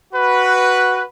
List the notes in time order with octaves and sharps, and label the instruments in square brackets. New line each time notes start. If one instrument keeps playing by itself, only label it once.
[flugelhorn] F#4 [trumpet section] B4